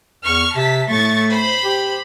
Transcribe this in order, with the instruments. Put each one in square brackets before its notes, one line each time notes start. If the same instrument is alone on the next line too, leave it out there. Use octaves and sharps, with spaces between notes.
[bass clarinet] E2 [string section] C#6 F6
[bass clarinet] C3 [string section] A5 B6
[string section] A2 C#6 A6 [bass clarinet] A3
[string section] C5 B5
[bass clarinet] G4